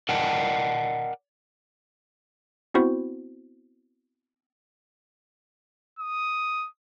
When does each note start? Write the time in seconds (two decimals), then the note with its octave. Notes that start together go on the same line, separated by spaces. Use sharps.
0.09 A#4 D5 D#5 F#5 G5 A5
2.74 B3 C4 E4 F#4 C5
5.99 D#6